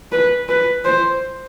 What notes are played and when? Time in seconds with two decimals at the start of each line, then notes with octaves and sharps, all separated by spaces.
0.12 B4
0.49 B4
0.85 C5